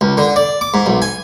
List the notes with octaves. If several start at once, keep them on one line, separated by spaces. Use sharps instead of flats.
C#2
D3
D5
D6
G#2
B1
G#5